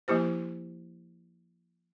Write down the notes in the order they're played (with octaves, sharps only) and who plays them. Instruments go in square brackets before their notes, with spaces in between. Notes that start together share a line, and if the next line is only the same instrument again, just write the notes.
[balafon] F3 A#3 E4 G4 C5